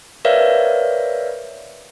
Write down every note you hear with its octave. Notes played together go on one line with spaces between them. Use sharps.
A#4 B4 C#5 D5 E5 F5